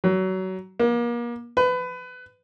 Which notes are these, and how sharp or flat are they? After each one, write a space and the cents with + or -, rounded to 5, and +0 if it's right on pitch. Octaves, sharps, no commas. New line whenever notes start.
F#3 +25
A#3 +35
B4 +25